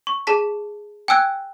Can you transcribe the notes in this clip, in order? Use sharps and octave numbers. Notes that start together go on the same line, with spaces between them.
C#6
G#4 A5 B6
G5 G#5 E6 F#6 G#6